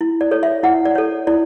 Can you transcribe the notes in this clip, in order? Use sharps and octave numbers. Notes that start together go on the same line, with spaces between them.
E4
D5
A4 C#5
E5
E4 F#5
D5
A4 C#5
E4 D5